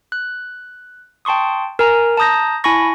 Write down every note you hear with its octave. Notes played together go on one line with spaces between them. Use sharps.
F#6
G5 A5 C6 C#6 D#6
A#4 G#5 A#5
A5 A#5 D#6 G6 A#6
E4 G#5 A5 B5 C#6 A#6